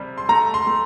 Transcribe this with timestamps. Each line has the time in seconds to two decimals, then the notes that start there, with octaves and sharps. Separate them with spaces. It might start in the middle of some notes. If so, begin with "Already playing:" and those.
Already playing: C3 G3
0.18 C6
0.29 A3 A#5
0.54 C6
0.67 A3